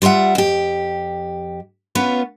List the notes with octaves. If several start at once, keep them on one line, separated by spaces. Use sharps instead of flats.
G3 F4 D#5 E5 F#5
F2 G4
B3 C#4 F4 B4